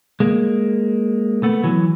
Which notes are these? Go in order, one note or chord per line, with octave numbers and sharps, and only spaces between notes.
G#3 A#3
A3 B3
E3 F#3